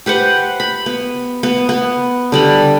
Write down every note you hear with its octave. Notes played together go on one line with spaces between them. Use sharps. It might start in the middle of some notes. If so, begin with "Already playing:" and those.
G4 B4 C5 F#5
B5
B3
B3
B3
D3 G3 B5